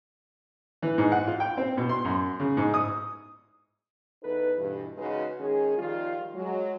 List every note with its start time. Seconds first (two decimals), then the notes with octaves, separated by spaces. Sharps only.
0.82 E3
0.98 G#2
1.12 F#5
1.27 F4
1.40 G5
1.57 C4
1.77 B2
1.89 C6
2.05 F#2
2.40 C#3
2.57 G#2
2.74 D#6
4.23 E2 D#4 A4 B4
4.57 G2 B2 E3
4.97 C#3 G#3 D#4 F#4 B4
5.39 D#3 G#3 C#4 G#4
5.77 D#3 F3 G3 F4
6.34 F#3 G#3